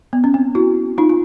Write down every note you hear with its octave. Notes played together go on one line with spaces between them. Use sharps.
B3
C#4
C4
E4 F#4
D#4 F4
F4